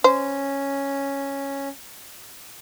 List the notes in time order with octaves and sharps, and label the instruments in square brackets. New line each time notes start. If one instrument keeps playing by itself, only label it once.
[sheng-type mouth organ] C#4 [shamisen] C5